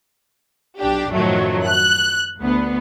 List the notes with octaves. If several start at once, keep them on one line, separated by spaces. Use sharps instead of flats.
B1 D4 G4
F#2 A2 D#3 F3 F#3 A3
F#6
D2 B3